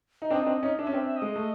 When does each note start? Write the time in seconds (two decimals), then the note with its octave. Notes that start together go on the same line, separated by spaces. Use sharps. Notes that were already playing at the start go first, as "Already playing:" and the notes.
0.22 D#4
0.31 C4 D4 D#5
0.42 D#4
0.46 C4 D4
0.63 C#4 D#4
0.79 D4 E5
0.87 C#4
0.92 C4 D4 E5
1.04 E5
1.17 D#5
1.22 G#3
1.36 A3